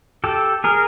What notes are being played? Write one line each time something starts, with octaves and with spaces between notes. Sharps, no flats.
G4 A4
G#4 A#4